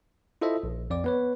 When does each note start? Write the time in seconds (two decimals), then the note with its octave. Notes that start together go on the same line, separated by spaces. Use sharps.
0.41 E4 F4 A4 C5 D#5 E5
0.63 A#1
0.90 F2 D5 D6
1.04 B3 B4 C#5